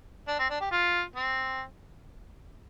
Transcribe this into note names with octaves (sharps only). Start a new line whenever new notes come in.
D4
C4
D4
G4
F4
C4